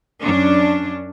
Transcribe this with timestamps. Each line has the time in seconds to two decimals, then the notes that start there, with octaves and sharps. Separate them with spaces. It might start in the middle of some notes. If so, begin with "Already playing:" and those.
0.21 F#2 C#4 D4